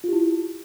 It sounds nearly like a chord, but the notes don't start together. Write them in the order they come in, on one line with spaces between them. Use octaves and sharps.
F4 G4 E4